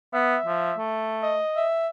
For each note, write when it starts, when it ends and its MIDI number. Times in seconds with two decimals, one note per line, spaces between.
0.14 0.36 59
0.14 0.83 76
0.45 0.72 53
0.78 1.40 57
1.23 1.69 75
1.57 1.88 76